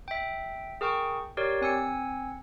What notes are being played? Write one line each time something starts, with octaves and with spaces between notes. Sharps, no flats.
E5 G5
G#4 A#4 G5 C#6
G4 A#4 C#5 D5
C4 G#5 E6 C#7